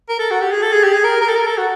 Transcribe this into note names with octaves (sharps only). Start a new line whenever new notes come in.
A#4
A4
F#4
G4
G#4
A4
G#4
G4
G#4
A#4
A#4
A4
A#4
A4
F#4